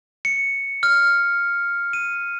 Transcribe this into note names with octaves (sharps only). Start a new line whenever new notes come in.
C#7
F6
D#7